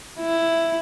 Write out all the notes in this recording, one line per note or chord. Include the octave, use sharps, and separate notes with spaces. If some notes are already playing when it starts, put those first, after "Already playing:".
E4